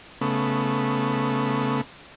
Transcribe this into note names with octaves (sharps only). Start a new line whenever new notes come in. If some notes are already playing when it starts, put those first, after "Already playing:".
C#3 A3 B3